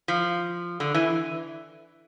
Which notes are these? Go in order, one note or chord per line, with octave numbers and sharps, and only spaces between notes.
F3
D3
E3